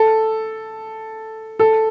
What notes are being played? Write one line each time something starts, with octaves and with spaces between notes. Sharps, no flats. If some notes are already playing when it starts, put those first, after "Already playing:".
Already playing: A4
A4